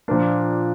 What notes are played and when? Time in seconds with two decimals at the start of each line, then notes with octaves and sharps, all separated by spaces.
0.08 A#2 F3 A#3 D4